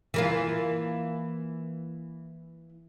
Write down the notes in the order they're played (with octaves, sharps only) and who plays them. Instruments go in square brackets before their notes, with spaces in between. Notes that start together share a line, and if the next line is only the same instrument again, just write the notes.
[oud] E3 A#3 F4